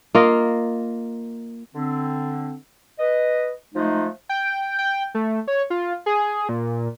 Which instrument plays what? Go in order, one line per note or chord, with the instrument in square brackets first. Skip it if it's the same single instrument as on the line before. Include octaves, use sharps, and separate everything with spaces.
[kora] A#3 F4 A#4 D#5
[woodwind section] D3 C4
B4 D#5
F3 G#3 A3 D#4
[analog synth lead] G5
G5
A3
C#5
F4
G#4
A#2